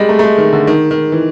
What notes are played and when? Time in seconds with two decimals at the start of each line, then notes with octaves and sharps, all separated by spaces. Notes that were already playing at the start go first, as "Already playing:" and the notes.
Already playing: G3 G#3
0.09 A3
0.19 A3
0.23 G#3
0.38 D#3
0.53 D3
0.67 D#3
0.91 D#3
1.12 E3